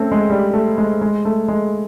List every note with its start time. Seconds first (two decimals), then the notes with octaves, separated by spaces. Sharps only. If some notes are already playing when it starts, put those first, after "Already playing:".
Already playing: A3 C4 C#4
0.12 G#3
0.30 G3
0.54 A3
0.78 G#3
1.01 G#3
1.25 A3
1.48 G#3